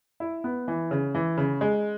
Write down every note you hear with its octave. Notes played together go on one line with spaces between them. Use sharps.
E4
B3
E3
C#3
E3
C#3
G#3